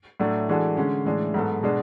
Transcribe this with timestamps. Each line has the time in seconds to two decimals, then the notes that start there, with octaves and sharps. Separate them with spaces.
0.20 A2 F#3 A3 D4
0.49 E3 G#3 D4 F#4 A4
0.77 D3 G#3 C#4
1.06 A2 E3 G#3 D4
1.34 G#2 F#3 B3 F#4 A4
1.63 B2 G#3 D4